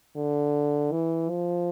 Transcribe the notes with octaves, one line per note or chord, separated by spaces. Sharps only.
D3
E3
F3